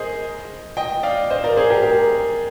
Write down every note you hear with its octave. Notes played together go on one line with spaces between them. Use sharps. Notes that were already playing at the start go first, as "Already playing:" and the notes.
Already playing: G#4 A#4 C5 D#5
D#5 G5
D5 F5
C5 D#5
A#4 D5
G#4 C5
G4 A#4
G4 A#4